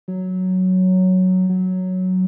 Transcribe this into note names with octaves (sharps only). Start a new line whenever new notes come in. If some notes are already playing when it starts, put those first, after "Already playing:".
F#3
F#3